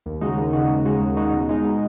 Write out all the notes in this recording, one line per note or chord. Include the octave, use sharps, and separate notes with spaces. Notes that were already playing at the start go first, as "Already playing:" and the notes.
D#2
C#3 G#3 D#4 F#4
D#2
C#3 G#3 D#4 F#4
D#2
C#3 G#3 D#4 F#4
D#2
C#3 G#3 D#4 F#4
B2
G#3 D#4
B2